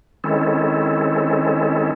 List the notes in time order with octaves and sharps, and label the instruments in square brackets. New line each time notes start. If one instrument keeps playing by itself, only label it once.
[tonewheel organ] D#3 G#3 C4 C#4 E4 A4